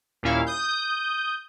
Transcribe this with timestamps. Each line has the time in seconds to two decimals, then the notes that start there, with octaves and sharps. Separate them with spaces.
0.23 D#2 A#2 C#4 E4 F5
0.47 D#6 G6